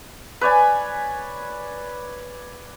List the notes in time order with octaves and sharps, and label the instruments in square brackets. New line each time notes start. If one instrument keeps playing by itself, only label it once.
[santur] B4 C#5 D5 G#5